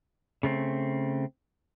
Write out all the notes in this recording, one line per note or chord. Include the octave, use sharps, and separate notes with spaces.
C#3 A3 C4